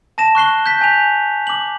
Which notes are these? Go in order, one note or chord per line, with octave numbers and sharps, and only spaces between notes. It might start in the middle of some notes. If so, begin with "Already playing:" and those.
A5 A#6 E7
C#6 F#6 C7 G7
G6 B6
G#5 F7
D6 F#7